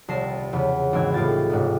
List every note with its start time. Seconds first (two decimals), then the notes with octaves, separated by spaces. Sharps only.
0.08 D#1 C2 A5 A#6 C7 E7
0.53 E2 C#3
0.93 G#1 E3 C4 E6 G#6
1.14 C#2 A2 F4 G4 A6
1.50 A1 G#2 C3